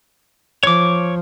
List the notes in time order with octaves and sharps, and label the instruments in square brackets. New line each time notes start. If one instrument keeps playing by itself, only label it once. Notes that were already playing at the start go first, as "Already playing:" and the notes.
[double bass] F3 [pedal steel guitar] C#5 D6